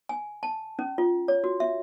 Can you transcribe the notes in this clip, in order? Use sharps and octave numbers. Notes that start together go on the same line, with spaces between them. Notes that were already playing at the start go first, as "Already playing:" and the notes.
G#5
A5
C#4
F4
C#5
F#4
E5